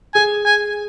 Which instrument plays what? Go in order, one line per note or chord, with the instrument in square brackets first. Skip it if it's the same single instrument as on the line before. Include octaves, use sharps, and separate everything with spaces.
[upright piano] G#4 [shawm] G#5
[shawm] G#5